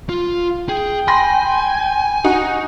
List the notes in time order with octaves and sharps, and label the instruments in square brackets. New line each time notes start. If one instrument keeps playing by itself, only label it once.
[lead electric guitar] F4
[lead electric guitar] G#4 [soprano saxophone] G5
[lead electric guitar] G#5 [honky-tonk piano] B5 C6 A#6
[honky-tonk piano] D#4 F#4